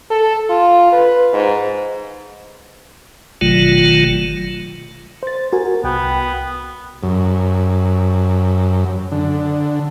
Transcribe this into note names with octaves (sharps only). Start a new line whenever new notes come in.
A4
F4
B4
G#2
G1 B2 D#3 F#3 A3 F4
C5 A6
F#4 A#4 G#5
C2 B3 G5
F#2
D3